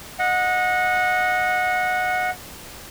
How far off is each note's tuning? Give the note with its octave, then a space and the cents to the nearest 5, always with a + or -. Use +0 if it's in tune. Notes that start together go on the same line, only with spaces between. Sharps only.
D#5 +0 F#5 -20